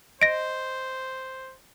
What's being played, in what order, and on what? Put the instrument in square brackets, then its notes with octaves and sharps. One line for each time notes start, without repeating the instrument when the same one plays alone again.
[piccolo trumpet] C5 [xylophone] D#5 [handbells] A#6 D7